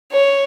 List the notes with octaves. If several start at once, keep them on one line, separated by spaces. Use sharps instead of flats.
C#5